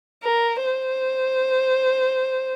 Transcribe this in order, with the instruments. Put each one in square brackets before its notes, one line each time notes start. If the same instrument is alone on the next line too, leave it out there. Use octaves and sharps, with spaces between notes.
[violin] A#4
C5